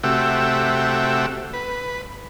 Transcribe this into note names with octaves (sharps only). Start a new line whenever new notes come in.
C3 A3 F#4 G4 E5
B4